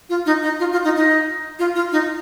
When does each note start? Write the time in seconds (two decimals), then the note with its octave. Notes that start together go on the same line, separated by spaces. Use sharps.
0.10 F4
0.26 D#4
0.43 D#4
0.60 F4
0.72 F4
0.84 D#4
0.96 D#4
1.59 F4
1.75 F4
1.92 D#4